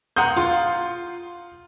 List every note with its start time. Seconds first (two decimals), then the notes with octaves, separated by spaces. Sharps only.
0.16 F#5 A#5 C6 D#6 G6
0.36 F4 C6